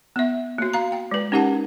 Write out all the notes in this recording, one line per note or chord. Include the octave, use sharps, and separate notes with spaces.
B3 E5
A#3 F#4
F5 A#5
G5
G#3 B4
C#4 D#4 G4 A#4 F#5 A5